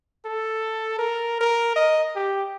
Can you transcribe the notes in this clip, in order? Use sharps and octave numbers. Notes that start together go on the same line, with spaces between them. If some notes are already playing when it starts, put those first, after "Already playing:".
A4
A#4
A#4
D#5
G4